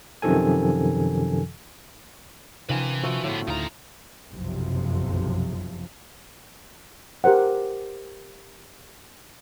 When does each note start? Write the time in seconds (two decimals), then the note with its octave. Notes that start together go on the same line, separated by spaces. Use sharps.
0.22 F#2 C3 D#3 F3 A4 G#5
2.69 C3 D#3 F3 C#4 B4 G#5
3.03 F3 A3 F#4
3.24 A2 D3 B3
3.47 D2 C#3 D#4 F4 A#5
4.31 F#1 B1 F2 C3 F3
7.24 G4 A#4 C5 F#5